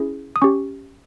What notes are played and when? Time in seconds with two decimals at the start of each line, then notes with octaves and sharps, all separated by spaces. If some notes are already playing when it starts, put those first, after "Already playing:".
Already playing: C#4 E4 G#4
0.36 D#6
0.42 C#4 G4 C#6